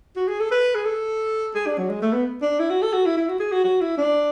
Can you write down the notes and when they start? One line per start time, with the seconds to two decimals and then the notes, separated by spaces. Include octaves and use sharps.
0.16 F#4
0.28 G#4
0.40 A4
0.51 B4
0.75 G#4
0.85 A4
1.55 G#4
1.66 D4
1.78 F#3
1.89 G#3
2.02 A3
2.13 B3
2.42 D4
2.60 E4
2.70 F#4
2.82 A4
2.93 F#4
3.06 E4
3.17 E4
3.29 F#4
3.40 G#4
3.52 F#4
3.64 F#4
3.81 E4
3.98 D4